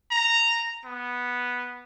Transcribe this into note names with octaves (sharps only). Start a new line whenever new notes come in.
A#5
B3